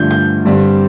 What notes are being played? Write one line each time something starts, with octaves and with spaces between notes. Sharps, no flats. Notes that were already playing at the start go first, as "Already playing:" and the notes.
Already playing: G2 D3 F3 A3 G6
G6
G2 D3 G3 C4